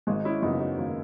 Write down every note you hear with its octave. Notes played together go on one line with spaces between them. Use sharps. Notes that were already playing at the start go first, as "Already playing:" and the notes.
G#1 G#3
D#4
C#4 E4
F#2 C#3 F#3 B3 D#4
D#4 F#4
G#1 A#3